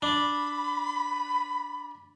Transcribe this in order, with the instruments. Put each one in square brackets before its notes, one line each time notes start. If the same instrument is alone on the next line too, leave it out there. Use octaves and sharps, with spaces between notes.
[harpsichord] D4 [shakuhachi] B5